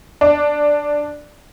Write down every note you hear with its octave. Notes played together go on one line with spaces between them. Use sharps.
D4